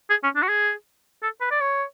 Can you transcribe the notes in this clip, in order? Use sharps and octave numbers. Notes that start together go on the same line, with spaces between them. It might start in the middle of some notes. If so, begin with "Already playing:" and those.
G#4
C#4
D4
F#4
G#4
A4
B4
D5
C#5